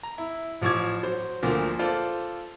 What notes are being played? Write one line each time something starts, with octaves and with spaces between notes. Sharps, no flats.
A#5
E4
A1 F3 C#6 D6 G#6
F#3 C5
D2 A#2 D3 F3 A#3
F4 A4 C5 D5